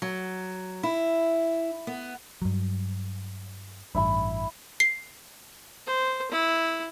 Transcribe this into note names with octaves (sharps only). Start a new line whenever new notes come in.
F#3
E4
B3
G2 F#3
A1 G2 E4 E5 B5
C7
C5
E4